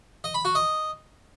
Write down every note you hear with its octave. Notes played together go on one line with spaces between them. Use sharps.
D#5
B5
F#4
D#5